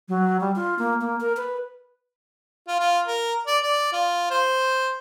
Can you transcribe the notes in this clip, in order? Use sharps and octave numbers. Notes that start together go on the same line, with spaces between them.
F#3
G3
F4
A#3
A#3
A#4
B4
F4
F4
A#4
D5
D5
F4
C5